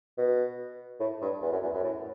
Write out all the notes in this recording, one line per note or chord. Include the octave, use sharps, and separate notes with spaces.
B2
A2
G2
E2
F#2
E2
F#2
A2